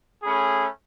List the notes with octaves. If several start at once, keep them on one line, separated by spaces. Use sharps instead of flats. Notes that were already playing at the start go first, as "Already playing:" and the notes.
A3 C#4 G#4 B5